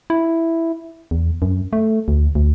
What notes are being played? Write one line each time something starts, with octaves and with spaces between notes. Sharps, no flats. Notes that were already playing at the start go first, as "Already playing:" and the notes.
E4
E2
F#2
A3
D2
D2